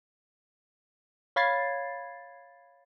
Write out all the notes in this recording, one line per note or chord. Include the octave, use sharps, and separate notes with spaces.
C#5 F5 B5 G#6 A6 C7